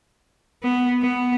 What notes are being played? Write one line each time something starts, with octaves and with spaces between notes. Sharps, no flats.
B3
B3